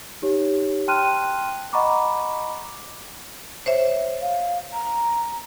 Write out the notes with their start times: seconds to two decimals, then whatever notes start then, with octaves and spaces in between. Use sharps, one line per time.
0.22 D#4 G4 C#5
0.88 G5 A5 C6 F6 F#6 D#7
1.73 D#5 F#5 A#5 B5 C#6 D6
3.66 C5 C#5 E5
4.22 F5
4.73 A#5